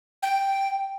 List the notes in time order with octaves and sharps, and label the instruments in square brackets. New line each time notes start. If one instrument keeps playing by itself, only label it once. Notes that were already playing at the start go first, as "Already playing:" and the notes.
[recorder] G5